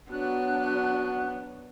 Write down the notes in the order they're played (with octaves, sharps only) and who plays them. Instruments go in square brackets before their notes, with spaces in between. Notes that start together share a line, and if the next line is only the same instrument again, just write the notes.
[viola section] F#3 D4 [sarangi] B3 [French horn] F#4 [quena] F#6